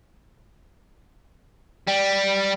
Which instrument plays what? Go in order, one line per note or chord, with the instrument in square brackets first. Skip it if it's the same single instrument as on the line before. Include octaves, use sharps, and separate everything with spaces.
[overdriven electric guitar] G3